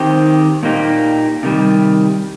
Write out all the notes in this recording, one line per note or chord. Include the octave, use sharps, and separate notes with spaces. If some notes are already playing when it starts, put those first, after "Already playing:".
Already playing: D#3 C4 G4
A#2 A#3 D#4 G4
C3 D#3 G3